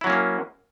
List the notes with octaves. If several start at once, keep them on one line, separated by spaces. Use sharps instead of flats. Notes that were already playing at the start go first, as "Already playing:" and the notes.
F#3 A#3 C#4 E4